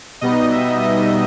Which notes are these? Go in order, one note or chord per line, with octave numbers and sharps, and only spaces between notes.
B2 G3 B3 D#4 D#5
E5
D#5